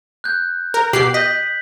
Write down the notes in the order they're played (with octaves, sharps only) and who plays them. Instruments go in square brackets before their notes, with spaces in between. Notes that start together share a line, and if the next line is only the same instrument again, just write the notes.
[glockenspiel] F#6 G6
[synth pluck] A#4
[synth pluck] B2 G4 C7 [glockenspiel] F#7
[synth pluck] D#5 [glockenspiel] G6 B6